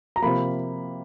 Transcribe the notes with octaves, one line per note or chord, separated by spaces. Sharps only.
A#5
C3 F3 A#3 B5